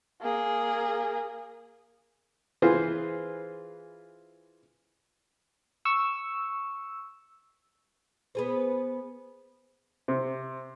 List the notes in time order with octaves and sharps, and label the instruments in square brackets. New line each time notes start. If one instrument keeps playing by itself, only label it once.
[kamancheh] A#3 G#4
[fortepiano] E3 F4 G#4 B4 C5
[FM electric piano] C#6 E6
[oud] B3 G#4 C5
[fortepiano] C3